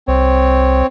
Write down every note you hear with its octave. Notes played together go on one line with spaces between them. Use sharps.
C2 C4 C#5